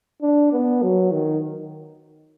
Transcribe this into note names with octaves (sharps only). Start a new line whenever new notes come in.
D4
B3
F#3
D#3